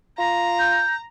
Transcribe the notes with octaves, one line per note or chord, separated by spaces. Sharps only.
F4 A#5
G6